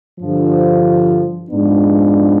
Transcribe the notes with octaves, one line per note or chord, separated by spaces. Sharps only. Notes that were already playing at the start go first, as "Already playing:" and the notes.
G2 D3 F3
G#2 F3 G#3 B3 D4